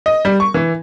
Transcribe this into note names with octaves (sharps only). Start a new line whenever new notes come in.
D#5
G3
C#6
E3